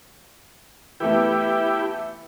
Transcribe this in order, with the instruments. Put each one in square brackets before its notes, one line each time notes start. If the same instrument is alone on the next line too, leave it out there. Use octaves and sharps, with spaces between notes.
[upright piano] E3 A3 B3 [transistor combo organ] E4 G4